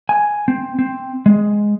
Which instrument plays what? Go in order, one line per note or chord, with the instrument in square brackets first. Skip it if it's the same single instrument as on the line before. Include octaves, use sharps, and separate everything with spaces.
[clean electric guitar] G#5
C4
C4
G#3